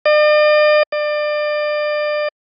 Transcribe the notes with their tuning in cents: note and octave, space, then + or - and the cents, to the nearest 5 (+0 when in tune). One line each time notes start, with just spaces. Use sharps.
D5 +45
D5 +30